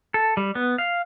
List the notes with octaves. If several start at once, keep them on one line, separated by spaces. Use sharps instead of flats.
A4
G3
B3
F5